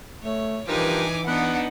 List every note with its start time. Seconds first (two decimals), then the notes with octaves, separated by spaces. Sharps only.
0.22 A3 C#5
0.68 G2 E3 F3 D#4 A#4 B4 G#5 D6
1.27 B3 D4 D#4 F#5